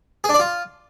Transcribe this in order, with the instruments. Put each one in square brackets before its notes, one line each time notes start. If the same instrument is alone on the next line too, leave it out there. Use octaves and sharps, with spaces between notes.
[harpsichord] G#4
D4
D5
F4